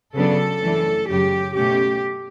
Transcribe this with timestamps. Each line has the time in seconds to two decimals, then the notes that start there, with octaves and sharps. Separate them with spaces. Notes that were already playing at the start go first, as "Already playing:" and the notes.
0.15 C#3 F#3 B3 D4 A4
0.62 F#2 E3 A3 D4
1.09 F#2 C#3 F#3 G4
1.56 B2 A3 C#4 G4